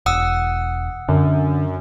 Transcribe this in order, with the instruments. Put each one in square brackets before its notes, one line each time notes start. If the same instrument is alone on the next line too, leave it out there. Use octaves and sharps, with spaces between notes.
[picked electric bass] E1 [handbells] F#5 D#6 E6
[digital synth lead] F#2 [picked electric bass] D3